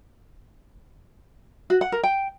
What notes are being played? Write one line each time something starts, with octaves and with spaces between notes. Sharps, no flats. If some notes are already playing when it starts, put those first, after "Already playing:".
F#4
F#5
A#4
G5